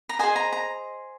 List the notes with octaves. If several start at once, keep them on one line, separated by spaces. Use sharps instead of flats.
A#5
G#4 C5 D#5 G#5
A#5
A#5